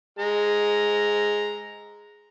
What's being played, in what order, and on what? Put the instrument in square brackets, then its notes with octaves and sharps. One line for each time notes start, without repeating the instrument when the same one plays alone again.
[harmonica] G#3 A#5